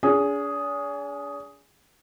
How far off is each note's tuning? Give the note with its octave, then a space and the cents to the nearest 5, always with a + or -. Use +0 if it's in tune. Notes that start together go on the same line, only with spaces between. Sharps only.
D4 -45 G#4 +0